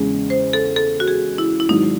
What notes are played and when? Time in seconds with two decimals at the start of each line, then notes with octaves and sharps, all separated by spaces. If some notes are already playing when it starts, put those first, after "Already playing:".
Already playing: E2 C#3 G#3 C#4
0.30 C5
0.53 A4
0.76 A4
1.00 F#4
1.08 G#4
1.38 E4
1.60 E4
1.68 G#1 G#2 F#3 D#4